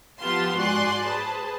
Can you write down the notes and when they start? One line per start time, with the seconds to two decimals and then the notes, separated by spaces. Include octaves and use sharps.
0.20 F3 B3 F4 G4 A5 C6
0.57 G#2 F#4 D5 G#5 C6 F#6
1.04 G#4 B4 C5 A5